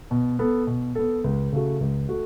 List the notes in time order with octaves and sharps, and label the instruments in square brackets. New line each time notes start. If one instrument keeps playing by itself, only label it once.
[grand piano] B2
B3 A4
B2
B3 A4
C#2
C#3 A3 F#4
C#2
A3 F#4